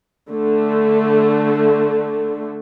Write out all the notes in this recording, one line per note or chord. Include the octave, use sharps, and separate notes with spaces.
D3 A3